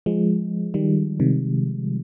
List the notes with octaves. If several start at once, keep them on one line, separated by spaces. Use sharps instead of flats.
F3 G#3
D#3 G3
C3 D#3